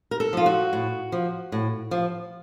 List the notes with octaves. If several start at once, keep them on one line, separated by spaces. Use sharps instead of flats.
A#4
A4
F3 F4
F#4
A2
F3
A2
F3